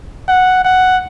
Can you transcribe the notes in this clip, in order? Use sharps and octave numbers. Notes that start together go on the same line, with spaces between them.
F#5
F#5